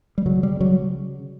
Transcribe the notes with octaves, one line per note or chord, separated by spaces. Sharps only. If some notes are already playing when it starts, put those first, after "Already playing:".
G3
C#3 F#3
G3
C#3 F#3